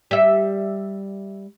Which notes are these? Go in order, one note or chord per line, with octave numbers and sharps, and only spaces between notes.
G3 E5